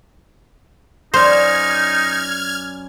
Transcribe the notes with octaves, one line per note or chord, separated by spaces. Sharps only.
F#2 D#4 C5 D5 F6 G#6